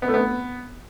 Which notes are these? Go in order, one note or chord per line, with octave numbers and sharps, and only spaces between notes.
B3
A3
B3